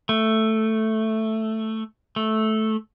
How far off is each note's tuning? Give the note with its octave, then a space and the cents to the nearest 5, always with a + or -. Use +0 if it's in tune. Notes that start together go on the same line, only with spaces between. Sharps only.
A3 +5
A3 -10